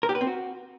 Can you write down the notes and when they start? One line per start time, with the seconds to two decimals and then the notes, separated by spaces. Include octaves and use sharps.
0.03 A#4
0.09 G4
0.15 B4
0.21 C4
0.27 F#4